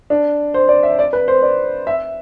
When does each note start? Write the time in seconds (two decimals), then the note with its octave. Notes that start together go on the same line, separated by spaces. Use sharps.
0.10 D4
0.54 C5
0.69 D5
0.83 E5
0.99 D5
1.13 B4
1.28 C5
1.43 D5
1.87 E5